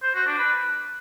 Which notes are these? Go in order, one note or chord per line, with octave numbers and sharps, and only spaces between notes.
C5
F#4
D4
B4